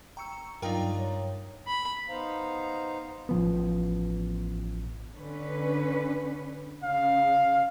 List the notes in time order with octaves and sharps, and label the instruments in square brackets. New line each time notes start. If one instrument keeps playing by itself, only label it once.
[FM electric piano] G5 C#6 E6 [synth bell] A#5 C#7
[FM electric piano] G2 [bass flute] F#3 [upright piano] D4 D#4 F4 [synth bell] A#4 G5 A#5
[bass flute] C#5
[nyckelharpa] B5
[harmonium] B3 D#4 C5 F5 A#5
[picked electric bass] A1 F3 B3
[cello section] D3 C#4 B4
[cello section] C#3 [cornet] F5